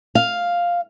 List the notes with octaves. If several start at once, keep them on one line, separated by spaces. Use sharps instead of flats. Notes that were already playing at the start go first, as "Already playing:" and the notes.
F5